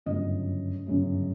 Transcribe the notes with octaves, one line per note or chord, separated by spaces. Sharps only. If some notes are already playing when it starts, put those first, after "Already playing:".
G1 F#2 C#3 F#3 A3 D#5
G1 F#2 C#3 F#3 A3